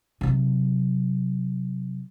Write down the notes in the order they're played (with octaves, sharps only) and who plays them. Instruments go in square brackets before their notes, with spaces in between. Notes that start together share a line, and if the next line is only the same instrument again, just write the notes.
[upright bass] C3 F#3